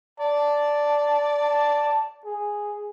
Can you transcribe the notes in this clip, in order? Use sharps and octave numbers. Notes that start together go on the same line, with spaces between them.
D5 A5
A5
G#4